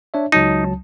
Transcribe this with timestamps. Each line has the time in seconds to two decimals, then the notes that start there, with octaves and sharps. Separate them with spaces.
0.14 D4 C#5 E5
0.32 C#2 F#3 D#4 A5